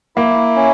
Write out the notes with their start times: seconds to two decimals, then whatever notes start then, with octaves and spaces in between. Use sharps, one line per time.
0.16 A#3 E4
0.56 C#4